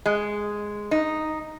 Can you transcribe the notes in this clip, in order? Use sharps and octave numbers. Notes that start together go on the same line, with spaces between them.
G#3
D#4